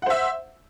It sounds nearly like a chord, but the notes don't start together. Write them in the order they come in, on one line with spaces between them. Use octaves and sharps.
F#5 C5 E5